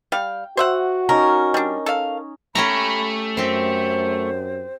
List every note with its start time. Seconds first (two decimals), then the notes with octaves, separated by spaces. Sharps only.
0.12 G3 F5 G5
0.57 F#4 C5 E5 F#5
1.09 C#4 D#4 A#4 D#5
1.54 G3 D4
1.86 A4 F5
2.55 A3 C#4 G4 A#5 B5
3.37 F#2 C4 G4 C5